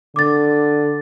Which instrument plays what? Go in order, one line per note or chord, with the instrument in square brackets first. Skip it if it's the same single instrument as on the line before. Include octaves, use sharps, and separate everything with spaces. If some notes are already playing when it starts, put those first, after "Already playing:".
[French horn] D3 [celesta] D6 A6